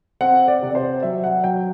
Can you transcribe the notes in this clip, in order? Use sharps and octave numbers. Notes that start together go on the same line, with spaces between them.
C4 F#5
D5
C3
D5
C5
F#3 E5
F#5
F#3 G5